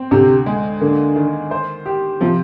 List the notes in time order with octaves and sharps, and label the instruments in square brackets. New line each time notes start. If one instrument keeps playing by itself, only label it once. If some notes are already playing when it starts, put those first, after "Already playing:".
Already playing: [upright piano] C4
[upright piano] D2 [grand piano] C3
[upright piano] G#3
[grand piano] D3 [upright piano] A#3
[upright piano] D#3
C5
G4
[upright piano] C3 [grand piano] F3